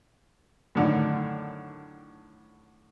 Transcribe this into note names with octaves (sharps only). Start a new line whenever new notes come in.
F#2 A2 D3 D#3